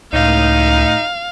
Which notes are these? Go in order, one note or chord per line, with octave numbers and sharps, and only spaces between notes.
C#2 A2 D#4 F5